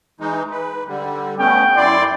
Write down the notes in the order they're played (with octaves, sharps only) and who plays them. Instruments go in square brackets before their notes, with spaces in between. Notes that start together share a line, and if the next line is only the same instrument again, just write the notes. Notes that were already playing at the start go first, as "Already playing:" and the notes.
[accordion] E3 G#3 D#4
B4
D3 G3
[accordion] A3 B3 C#4 [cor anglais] G5
[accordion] F#2 E4 C6 [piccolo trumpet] D5